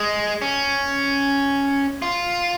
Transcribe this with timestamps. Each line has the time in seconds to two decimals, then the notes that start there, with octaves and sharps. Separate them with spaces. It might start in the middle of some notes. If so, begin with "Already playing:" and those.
Already playing: G#3
0.42 C#4
2.02 F4